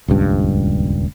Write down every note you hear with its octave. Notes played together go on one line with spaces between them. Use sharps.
D#1 C#2 G2